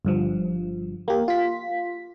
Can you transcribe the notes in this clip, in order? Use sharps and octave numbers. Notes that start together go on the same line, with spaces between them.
G1 G2 F3
A#3 G4
F4 B6